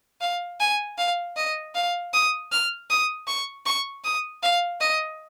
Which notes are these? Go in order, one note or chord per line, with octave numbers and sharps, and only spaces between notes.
F5
G#5
F5
D#5
F5
D#6
F6
D#6
C#6
C#6
D#6
F5
D#5